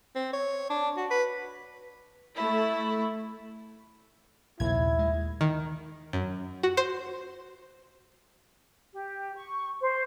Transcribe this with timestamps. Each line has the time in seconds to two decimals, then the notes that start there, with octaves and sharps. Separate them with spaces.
0.15 C4
0.33 C#5
0.70 D4
0.97 F#4
1.11 B4
2.35 A3 E4
4.60 A#1 D#2 C3 E4 G#6
4.99 G#3
5.41 D#3
6.13 F#2
6.63 F#4
6.77 C5
8.92 G4
9.35 C#6
9.81 C5